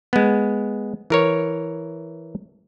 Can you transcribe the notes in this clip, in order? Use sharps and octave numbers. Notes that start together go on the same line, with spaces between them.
G#3 B3
E3 A#4 C#5